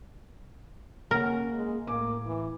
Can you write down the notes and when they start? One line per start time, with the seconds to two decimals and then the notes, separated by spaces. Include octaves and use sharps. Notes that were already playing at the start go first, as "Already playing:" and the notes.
1.11 C#3 A#3 C#4 A#4 F#5
1.54 G#3
1.87 A2 A#3 G#5 D6
2.26 E3